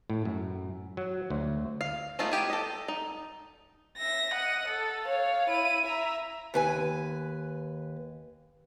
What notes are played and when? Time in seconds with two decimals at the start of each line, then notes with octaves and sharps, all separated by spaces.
0.10 A2
0.25 F#2
0.97 F#3
1.30 D2
1.81 F5
2.19 G#3 A3 B3 D#4 F4
2.31 B3 G4 G#5
2.50 A4 D#5
2.88 D#4
3.97 E5 A#6
4.32 D#5 F#5
4.68 A4
5.05 C#5 F5
5.49 E4 D#7
5.86 E5 A#5
6.54 D#2 B4 G#5